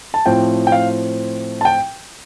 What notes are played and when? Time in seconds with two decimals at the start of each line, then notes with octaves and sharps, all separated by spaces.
0.14 A5
0.26 A2 F3 C4 G5
0.67 G5
0.72 F5
1.61 A5
1.65 G5